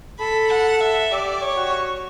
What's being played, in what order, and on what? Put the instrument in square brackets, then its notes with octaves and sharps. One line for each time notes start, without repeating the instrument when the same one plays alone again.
[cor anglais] A4 [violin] B5
[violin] F#5
E5
[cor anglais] G4 [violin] D5
[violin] C#5
[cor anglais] F#4